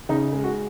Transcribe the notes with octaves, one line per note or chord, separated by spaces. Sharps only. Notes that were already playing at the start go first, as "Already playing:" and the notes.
C#3 D#4
G#3
F#4